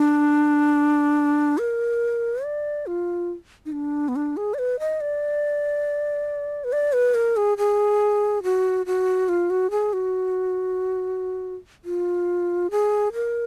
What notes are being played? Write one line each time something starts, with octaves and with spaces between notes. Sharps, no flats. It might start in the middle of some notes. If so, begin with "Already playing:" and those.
Already playing: D4
A#4
D5
F4
D#4
D4
B3
D4
G#4
D5
B4
D#5
D5
B4
D5
B4
A#4
G#4
G#4
F#4
F#4
F4
F#4
G#4
F#4
F4
G#4
A#4